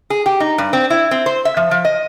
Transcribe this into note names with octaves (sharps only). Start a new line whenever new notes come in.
G#4
G4
D#4
G2
C4
E4
C4
C5
E5
F3
F3
D#5